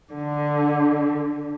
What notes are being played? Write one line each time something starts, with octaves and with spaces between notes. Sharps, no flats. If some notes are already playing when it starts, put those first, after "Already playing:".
D3